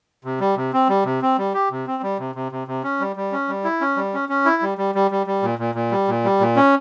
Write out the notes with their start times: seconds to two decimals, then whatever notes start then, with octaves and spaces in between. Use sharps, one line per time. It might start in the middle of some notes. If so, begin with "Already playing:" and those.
0.24 C3
0.40 G3
0.56 C3
0.73 C4
0.89 G3
1.05 C3
1.22 C4
1.38 G3
1.54 G4
1.71 C3
1.87 C4
2.03 G3
2.19 C3
2.35 C3
2.52 C3
2.68 C3
2.84 C#4
3.00 G3
3.16 G3
3.32 C#4
3.48 G3
3.64 E4
3.81 C#4
3.97 G3
4.14 C#4
4.29 C#4
4.45 E4
4.62 G3
4.78 G3
4.95 G3
5.11 G3
5.27 G3
5.43 A#2
5.59 A#2
5.75 A#2
5.91 G3
6.08 A#2
6.24 G3
6.40 A#2
6.56 C#4